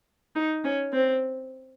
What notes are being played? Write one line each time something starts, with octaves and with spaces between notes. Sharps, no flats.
D#4
C#4
C4